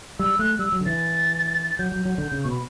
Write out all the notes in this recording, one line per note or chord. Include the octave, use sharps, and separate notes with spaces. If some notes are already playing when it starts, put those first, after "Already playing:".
G3 E6
A3 F#6
G3 E6
F#3
D3
E3 A6
F#3 G6
F#3
F#3
D3
C#3
B2 C#6
B5